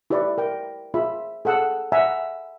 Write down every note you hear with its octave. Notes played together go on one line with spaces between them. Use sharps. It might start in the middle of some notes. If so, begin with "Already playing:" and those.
E4 G4 B4 D5 B5 C#6
A#4 G5
F4 G#4 E5 B5
G#4 A4 F#5 A5 E6
E5 F#5 G#5 A#5